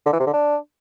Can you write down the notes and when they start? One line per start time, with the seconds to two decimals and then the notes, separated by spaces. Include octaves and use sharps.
0.06 D3
0.13 E3
0.20 C3
0.27 D3
0.33 D4